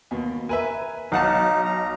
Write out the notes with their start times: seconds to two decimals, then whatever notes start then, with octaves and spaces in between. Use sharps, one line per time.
0.11 D#2 B2
0.49 A#4 B4 E5 G#5
1.12 B1 D#4 F5 F#5 A5
1.65 A#5